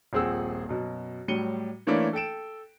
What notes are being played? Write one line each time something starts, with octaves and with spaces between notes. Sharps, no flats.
D#1 A#1 C4 G#4 F#5 E6
F#2 B2
A2 F#3 G3 C#7 D#7 G7
E3 A3 A#3 C#4 D4 E4
A4 G5 D7 E7